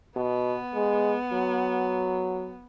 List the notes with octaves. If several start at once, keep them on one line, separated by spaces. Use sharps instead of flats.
B2 B3
G#3
F#3